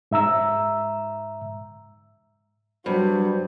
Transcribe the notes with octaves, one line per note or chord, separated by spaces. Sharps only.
G#2 E5 A#5 E6
G2 F#3 C5